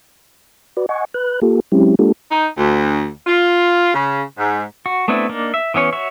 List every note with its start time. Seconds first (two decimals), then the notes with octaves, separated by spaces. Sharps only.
0.77 F#4 B4 D5
0.89 D#5 F#5 G#5 C#6
1.14 B4 F#6
1.42 A#3 F4 G4 A4
1.72 F#3 G#3 C4 C#4 E4 G4
1.99 G#3 A#3 D4 F4 G4 A4
2.29 D#4
2.56 D2
3.25 F4
3.93 C#3
4.37 G#2
4.86 F#4
5.08 A3 B3 C4 D4 E4
5.29 A#3 D4 D#4
5.54 E5
5.74 E3 B3 C#4 C#5
5.92 F#4 C#5 E5